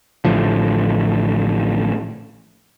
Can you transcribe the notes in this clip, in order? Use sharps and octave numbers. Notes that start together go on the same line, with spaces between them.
A1 A2 D3 F3